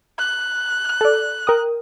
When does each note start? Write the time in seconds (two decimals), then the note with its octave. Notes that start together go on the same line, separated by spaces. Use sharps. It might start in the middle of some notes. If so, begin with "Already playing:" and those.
0.19 F#6
1.01 A4 D5
1.47 A#4 G5 D#6